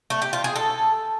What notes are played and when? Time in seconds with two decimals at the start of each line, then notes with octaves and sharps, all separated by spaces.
0.10 A3
0.22 G4
0.33 F4
0.44 G#4
0.56 A4